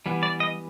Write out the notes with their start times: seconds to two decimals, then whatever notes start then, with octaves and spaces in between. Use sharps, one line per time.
0.06 E3 G3 B3
0.23 D5
0.40 D#5